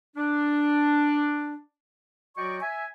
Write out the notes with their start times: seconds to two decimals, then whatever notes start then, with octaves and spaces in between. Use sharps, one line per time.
0.16 D4
2.37 F#3 F#4 D5 D#5 G5 C#6
2.62 E5 G#5